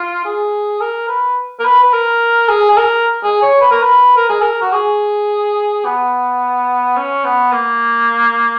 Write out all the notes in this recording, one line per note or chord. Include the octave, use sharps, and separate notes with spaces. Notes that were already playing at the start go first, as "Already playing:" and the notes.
Already playing: F4
G#4
A#4
B4
A#4
B4
B4
A#4
G#4
G#4
A#4
G#4
C#5
B4
A#4
B4
A#4
G#4
A#4
F#4
G#4
B3
C#4
B3
A#3